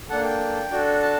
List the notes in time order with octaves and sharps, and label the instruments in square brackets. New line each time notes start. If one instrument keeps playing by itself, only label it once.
[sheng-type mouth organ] A#3 D4 A4 F#5
G5
D4 F#4 A4
A5